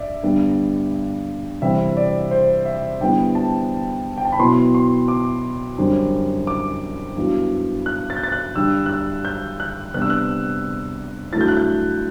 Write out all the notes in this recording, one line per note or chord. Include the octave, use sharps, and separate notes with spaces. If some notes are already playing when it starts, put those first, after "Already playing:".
Already playing: G2 D5 E5
G2 D3 G3 B3
C3 E3 G3 C4 E5
D5
C5
E5
D3 G3 B3 E4 G5
A5
G5
A5
B5
B2 F#3 B3 E4 C6
C6
D6
F#2 D3 G3 C4
D6
G2 F#3 B3 E4
F#6
A6
G6
A6
F#6
G2 D3 G3 D4 E6
F#6
E6
G6
F#6
C3 G3 B3 D4 F#6
E6
F#6
G2 F#3 A3 E4 A6
G6
F#6
G6